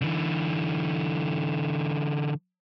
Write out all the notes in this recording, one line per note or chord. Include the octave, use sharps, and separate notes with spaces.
D3 E3